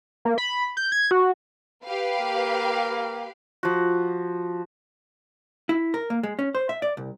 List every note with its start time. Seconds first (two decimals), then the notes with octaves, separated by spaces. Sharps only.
0.25 A#3
0.38 B5
0.77 G6
0.92 G#6
1.11 F#4
1.84 G4 B4 F5
2.21 A#3
3.63 F3 F#4
5.69 E4
5.94 A#4
6.10 A#3
6.23 G#3
6.39 C#4
6.55 C5
6.69 E5
6.82 D5
6.97 C2